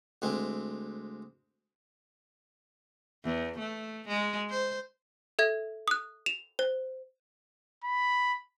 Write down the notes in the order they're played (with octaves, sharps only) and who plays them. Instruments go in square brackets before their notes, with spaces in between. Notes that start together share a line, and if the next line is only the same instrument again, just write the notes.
[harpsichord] D2 G#3 C4
[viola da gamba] E2
A3
G#3
C5
[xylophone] A4 E5 G#6
D#6 F#6
E7 F7
C5
[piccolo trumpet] B5